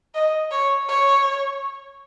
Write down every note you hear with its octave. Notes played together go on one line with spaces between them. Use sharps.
D#5
C#5
C#5